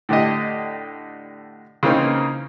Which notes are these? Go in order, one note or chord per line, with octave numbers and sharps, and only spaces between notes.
A2 D3 G4 D#5
C#3 E3 A#3 C4 D#4